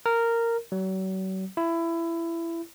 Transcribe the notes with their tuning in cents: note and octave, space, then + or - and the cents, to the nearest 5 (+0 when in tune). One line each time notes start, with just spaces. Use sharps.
A#4 -10
F#3 +40
E4 +20